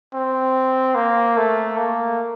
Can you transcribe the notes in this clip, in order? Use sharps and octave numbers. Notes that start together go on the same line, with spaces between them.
C4
A#3
A3
A#3